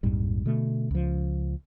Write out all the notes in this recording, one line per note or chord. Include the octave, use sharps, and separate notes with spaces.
A#1 F2 G#2 G3
B2 D3 A3
C#2 F3